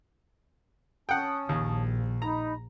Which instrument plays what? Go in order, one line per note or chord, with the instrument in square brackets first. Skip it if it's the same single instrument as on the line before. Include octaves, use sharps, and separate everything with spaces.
[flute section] C#4 A5 D#6 [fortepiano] F#5 G5
[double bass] A#1 [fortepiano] D#2
[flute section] D#4 B5 [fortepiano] A#5